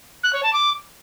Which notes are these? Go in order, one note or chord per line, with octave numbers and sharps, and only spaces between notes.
F#6
C#5
A5
D6